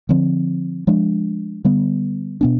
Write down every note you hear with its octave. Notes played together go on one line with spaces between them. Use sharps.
D3 F3 C4
F3 G#3 D4
D3 G3 B3
B2 B3 D4